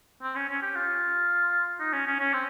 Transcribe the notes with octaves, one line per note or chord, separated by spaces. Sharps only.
C4
C#4
C#4
G4
F4
D#4
C#4
C#4
C#4
C4